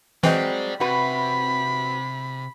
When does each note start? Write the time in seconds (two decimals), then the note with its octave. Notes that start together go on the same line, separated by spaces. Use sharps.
0.23 E3 F#3 G#3 C4 D5 G5
0.80 C3 F#4 B4 B5